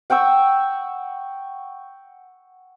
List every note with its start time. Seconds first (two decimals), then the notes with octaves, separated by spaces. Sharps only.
0.10 F#5 G5 C#6 E6